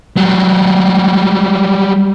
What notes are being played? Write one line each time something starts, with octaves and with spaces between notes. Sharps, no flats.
F#3 G3